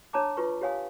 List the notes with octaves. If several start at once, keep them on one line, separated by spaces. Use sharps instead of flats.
D4 C#5 A5 A#5 D6
F4 B4 C#6
G4 C#5 F5 G#5 D#6